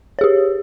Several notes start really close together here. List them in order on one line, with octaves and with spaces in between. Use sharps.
C#5 G#4 G4